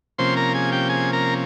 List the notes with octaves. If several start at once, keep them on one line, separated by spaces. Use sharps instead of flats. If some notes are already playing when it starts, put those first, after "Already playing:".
C3 F3 A#3 C#4 C5 C6
A#4 A#5
G#4 G#5
G4 G5
G#4 G#5
A#4 A#5